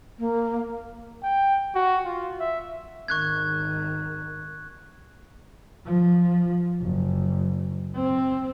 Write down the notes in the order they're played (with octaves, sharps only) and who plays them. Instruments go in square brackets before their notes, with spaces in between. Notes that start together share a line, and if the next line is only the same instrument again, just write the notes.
[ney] A#3
[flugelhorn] G5
F#4
F4
E5
[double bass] G#1 D#3 [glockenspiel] C#6 F#6 G#6
[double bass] F3
F#1
C4